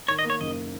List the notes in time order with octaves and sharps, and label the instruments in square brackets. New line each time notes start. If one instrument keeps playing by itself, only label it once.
[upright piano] D#3 [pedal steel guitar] C#5
[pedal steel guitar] D#5
[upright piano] A#3
[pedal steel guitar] C#5
[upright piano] F#1 [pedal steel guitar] D#5